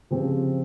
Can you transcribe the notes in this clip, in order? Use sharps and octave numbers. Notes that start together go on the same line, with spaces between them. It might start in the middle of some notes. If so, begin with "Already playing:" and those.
C#3 F3 C4 G4 C5